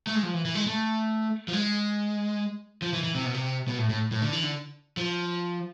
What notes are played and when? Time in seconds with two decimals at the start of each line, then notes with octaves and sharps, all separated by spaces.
0.07 A3
0.15 G#3
0.23 F3
0.34 E3
0.45 E3
0.55 G#3
0.67 A3
1.48 F3
1.53 G#3
2.82 F3
2.93 E3
3.03 E3
3.15 C3
3.25 B2
3.34 C3
3.68 B2
3.79 A2
3.90 A2
4.12 A2
4.22 D3
4.33 E3
4.43 D3
4.97 F3